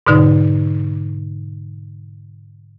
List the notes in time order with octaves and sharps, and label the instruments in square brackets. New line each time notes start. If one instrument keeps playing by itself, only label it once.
[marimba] G#2 B2 D3 D#4